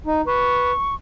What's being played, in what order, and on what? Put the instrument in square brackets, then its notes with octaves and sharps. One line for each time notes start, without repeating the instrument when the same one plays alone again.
[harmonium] D#4
[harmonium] B4 [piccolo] C#6